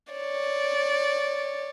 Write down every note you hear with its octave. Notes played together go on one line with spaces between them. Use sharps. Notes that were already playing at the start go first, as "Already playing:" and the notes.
C#5 D5